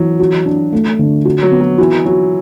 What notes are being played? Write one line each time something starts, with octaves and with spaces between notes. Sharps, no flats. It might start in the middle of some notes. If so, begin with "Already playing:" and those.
Already playing: E3 F#3
F#4
D4
A3
D3
F#4
F#3
B3
F#3
E3 F#4
F#3 F#4